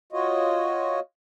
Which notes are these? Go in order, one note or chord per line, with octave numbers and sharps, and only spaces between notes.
F4 F#4 C#5 D#5